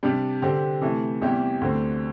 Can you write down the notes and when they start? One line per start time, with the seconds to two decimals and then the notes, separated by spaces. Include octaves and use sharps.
0.03 C3 G3 D4
0.42 D3 C4 G4
0.81 C3 E3 A3
1.21 E2 C3 G3 E4 G4
1.61 D2 D3 C4